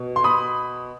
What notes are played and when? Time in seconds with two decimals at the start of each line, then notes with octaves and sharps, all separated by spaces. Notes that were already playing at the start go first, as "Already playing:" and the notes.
Already playing: B2
0.16 C6
0.24 B5 D#6